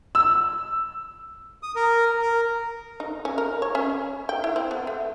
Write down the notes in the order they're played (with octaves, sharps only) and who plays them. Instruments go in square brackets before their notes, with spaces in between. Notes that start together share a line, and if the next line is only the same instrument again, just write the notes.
[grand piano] E6
[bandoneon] D#6
A#4
A#4
[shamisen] D#4
C#4
A#4
C#5
C#4
G5
E4
C4
B3
A3